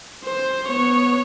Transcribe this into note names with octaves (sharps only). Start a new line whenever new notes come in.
C5
B3 C#5